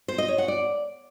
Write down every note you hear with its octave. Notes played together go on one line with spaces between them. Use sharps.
C5
D#5
C#5
F#5
D5